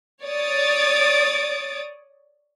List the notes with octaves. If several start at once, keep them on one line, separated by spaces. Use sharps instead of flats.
C#5 D5 D#6 A6 D7